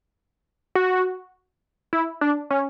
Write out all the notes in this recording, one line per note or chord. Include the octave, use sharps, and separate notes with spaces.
F#4
E4
D4
C#4